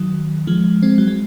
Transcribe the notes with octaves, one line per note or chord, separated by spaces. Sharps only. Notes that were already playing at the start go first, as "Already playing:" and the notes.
Already playing: D#3 F#3
F3 G#3
G#3 C4
F#3
G#3